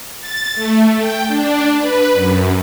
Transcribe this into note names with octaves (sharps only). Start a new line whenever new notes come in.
A6
A3
G5
D4
B4
F#2